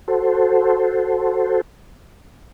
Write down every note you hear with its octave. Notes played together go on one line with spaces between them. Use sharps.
F#4 A4 C5